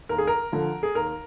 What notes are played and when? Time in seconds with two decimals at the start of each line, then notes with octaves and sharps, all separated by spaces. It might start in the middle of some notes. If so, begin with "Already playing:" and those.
0.09 D#2 A#4
0.18 G#4
0.27 A#4
0.52 D3 F3
0.83 G#4
0.95 D#2 A#4